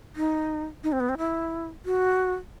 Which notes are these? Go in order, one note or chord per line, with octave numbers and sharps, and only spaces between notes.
D#4
D#4
C4
B3
C4
E4
F#4